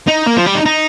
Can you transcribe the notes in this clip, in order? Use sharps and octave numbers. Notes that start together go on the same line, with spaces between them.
D#4
A#3
F3
G3
D#4
D#4